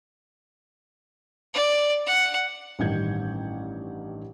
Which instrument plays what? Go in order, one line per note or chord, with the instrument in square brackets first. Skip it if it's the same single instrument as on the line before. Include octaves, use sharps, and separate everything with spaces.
[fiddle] D5
F#5
[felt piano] A1 G2 D#3 G5 G6 G#6